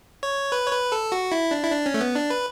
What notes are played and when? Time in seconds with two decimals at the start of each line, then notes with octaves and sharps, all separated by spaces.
0.23 C#5
0.52 B4
0.67 C#5
0.73 B4
0.92 A4
1.12 F#4
1.32 E4
1.51 D4
1.64 E4
1.71 D4
1.86 C#4
1.94 A3
2.00 B3
2.15 D4
2.30 B4